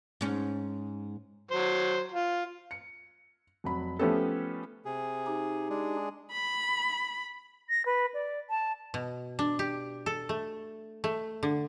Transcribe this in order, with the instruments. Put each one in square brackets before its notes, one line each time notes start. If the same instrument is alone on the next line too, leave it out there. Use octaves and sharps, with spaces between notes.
[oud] G#2 C#4
[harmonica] F#3 C5
F4
[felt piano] C#7
F1 F#3 B5
F3 A3 B3 C#4 G4 A4
[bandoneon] C3 G#4
[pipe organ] D#4 G4
[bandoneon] G#3 D4 G#4
[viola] B5
[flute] A#6
B4
D5
A5
[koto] B2
D4
G4
A4
A3
A3
D3